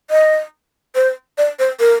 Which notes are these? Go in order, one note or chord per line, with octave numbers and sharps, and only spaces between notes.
D#5
C5
D5
C5
A#4